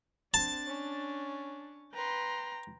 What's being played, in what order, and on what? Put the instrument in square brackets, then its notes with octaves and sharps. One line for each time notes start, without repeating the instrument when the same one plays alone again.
[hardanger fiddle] C4 [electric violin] D4 [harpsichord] A5
[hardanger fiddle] C#4
[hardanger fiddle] B4 C6 [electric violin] G5 A#5